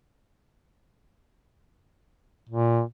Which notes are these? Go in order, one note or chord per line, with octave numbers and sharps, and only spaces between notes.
A#2